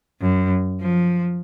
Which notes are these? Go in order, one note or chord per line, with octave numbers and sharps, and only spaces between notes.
F#2
F3